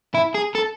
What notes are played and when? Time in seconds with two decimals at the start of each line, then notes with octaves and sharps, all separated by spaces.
0.15 E4
0.35 G#4
0.55 A4